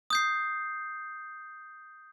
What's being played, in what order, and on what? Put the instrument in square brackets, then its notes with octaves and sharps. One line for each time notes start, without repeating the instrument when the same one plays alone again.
[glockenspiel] D#6 G6 C7